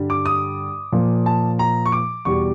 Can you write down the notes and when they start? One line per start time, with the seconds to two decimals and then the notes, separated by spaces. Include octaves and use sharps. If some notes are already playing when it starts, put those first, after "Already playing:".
Already playing: G2 D3 G3
0.10 D6
0.26 D#6
0.92 A#2 F3
1.26 A5
1.59 A#5
1.86 C#6
1.92 D6
2.25 E2 B2 G3 C#6